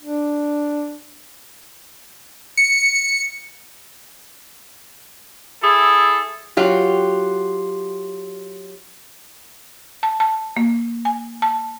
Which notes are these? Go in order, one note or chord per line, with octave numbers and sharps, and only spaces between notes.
D4
C#7
E4 G#4 A4
F#3 F4 G4
A5
A5
A#3
G#5
A5